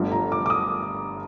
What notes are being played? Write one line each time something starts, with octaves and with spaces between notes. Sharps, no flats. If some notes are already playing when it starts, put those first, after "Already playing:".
Already playing: G1 G2 D3 F3 A3
A#5
D6
D6
D#6